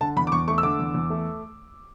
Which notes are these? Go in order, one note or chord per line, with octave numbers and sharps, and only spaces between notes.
D3 A5
E2 B5
D6
E2 C#6
A3 C#6
E6
D3 D6
E2
E2
A3